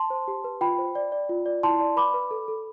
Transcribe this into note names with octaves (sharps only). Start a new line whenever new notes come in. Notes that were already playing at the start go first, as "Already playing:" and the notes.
Already playing: A5 C6
C5
G4
B4
F4 G5 B5
C5
D5
D5
F4
D5
E4 A5 C6
D5
B4 B5 D6
B4
A4
A4